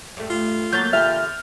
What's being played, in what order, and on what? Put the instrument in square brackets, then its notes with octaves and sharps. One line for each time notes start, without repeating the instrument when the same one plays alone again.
[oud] G2 A3
[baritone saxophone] F4
[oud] F#3 A3 A#3 [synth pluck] G6 A6
[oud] E2 D3 G3 [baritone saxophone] A#2 [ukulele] E5 [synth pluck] F6